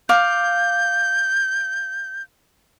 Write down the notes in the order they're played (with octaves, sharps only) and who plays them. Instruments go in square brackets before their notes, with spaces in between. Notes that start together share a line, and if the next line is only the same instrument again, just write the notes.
[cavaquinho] F5 D6 [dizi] G6